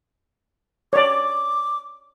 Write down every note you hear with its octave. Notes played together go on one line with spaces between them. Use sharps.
C#5 D5 D6